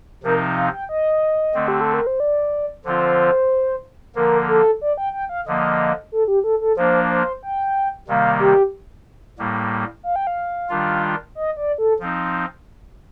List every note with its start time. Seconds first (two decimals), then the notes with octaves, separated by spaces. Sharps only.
0.23 C3 F3 C4 D#4 A#4
0.56 F5
0.73 G5
0.89 D#5
1.54 D3 A3 C4
1.68 G4
1.81 A4
1.94 A#4
2.07 C5
2.20 D5
2.84 D3 F3 C4 F4 C5
4.15 D3 F3 A#3 A#4
4.48 A4
4.81 D5
4.97 G5
5.13 G5
5.29 F5
5.46 D3 F3 A#3 D#5
6.12 A4
6.28 G4
6.44 A4
6.61 A4
6.77 F3 A#3 D4 C5
7.10 C5
7.43 G5
8.08 C3 D#3 G3 A#3 F5
8.40 G4
9.39 A2 G3 A#3
10.03 F5
10.16 G5
10.27 F5
10.69 D#3 G3 D4 F4
11.35 D#5
11.57 D5
11.78 A4
12.00 F3 C4 D#4